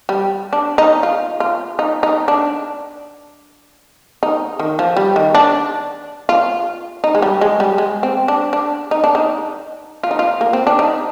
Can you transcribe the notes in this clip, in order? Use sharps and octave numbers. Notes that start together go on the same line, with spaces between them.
G3
D4
D#4
F4
F4
D#4
D#4
D4
D#4
D#3
F3
G3
D#3
D4
F4
D#4
G#3
G3
G#3
G3
G#3
C4
D4
D4
D#4
D4
D#4
F4
D#4
F4
A#3
C4
D4
D#4